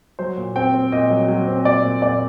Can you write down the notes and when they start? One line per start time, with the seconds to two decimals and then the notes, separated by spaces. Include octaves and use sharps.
0.19 F#3 C5
0.37 A#2
0.56 C4 G5
0.74 C4
0.92 A#2 D#5
1.10 F#3
1.28 F#3
1.47 C4
1.65 A#2 D5
1.84 A#2
2.02 A#2 D5